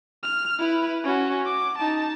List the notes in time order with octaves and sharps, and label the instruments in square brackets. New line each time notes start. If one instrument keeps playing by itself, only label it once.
[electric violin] F6
E4 B4
C#4 F#4
D6
D#4 A5